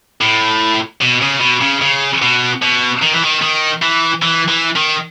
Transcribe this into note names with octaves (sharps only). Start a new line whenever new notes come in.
A2
B2
C#3
B2
C#3
C#3
B2
B2
D#3
E3
D#3
D#3
E3
E3
E3
D#3